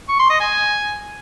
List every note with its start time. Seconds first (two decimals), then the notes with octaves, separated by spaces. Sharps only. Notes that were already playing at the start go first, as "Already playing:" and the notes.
0.09 C#6
0.19 C6
0.30 D#5
0.40 G#5